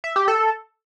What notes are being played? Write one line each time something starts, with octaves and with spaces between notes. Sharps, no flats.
E5
G4
A4